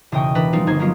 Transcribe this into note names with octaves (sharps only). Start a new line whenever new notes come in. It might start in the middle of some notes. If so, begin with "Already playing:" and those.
E1 C#3 D#5 G5 C#6
E3 D4 A#4 B4
F3 G3 G#3 C4 D#4 F4
G1 A#3 D#4 C5 G#6
F3 F#3 G#3 A#3 B3 F4